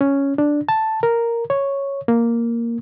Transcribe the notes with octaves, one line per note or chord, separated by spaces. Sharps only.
C#4
D4
A5
A#4
C#5
A#3